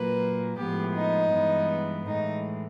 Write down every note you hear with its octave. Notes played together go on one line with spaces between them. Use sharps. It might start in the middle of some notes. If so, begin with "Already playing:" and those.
Already playing: A#2 F#3 A#3 B4
A2 F3 G#3 B3 G4
D#4
G2 E3 G#3 B3
A2 E3 G#3 D#4